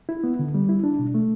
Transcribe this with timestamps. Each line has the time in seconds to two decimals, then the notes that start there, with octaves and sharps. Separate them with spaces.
0.09 E4
0.24 B3
0.39 D3
0.54 G3
0.69 E4
0.84 D4
0.99 B2
1.15 A3